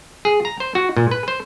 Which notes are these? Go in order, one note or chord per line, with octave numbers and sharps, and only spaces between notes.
G#4
A#5
C5
F#4
A#2
B4
C5